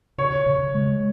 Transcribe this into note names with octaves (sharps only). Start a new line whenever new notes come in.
C#3 C#5
C#3
G#3